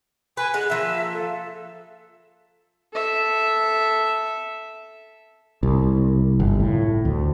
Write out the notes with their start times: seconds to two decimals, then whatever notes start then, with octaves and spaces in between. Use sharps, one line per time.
0.37 B4 G#5
0.54 D3 G#3 F#6
0.70 F3 A#3 E5
1.13 A4
2.93 A4 E5
5.63 C2
6.40 G1
6.60 A2
7.05 D2